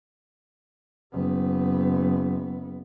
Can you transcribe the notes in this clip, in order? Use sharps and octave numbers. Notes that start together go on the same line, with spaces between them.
F#1 B3